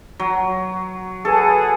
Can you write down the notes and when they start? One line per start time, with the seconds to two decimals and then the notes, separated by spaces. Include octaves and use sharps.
0.19 F#3
1.25 G#4 A4 B4 F#5